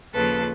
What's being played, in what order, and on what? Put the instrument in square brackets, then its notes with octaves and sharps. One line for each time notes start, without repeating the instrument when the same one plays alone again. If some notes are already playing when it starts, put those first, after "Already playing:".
[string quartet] D#2 C#3 F3 A4 B4